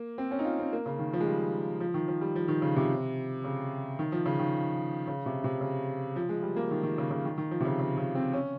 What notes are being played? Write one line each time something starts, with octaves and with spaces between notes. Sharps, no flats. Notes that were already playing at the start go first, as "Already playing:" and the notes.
Already playing: A#3
C4
C#4
D#4
F4
C4
A#3
C#3
D#3
F3
G#3
G3
F3
D#3
F3
G3
F3
D#3
C#3
C3
C#3
D#3
F3
C#3
D#3
C#3
C3
C3
C#3
F3
G#3
G3
A#3
D#3
D#3
C#3
C#3
D#3
D#3
F3
C3
C#3
C#3
C#3
C4
C#4